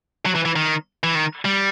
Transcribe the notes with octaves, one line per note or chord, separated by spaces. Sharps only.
F#3
E3
E3
D#3
E3
D#3
G3